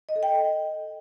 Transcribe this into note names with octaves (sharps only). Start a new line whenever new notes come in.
D#5
A4
G5